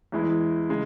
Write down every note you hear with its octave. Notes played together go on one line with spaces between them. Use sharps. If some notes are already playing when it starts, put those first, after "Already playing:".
E2 E3 G#3 E4
C#3 G#3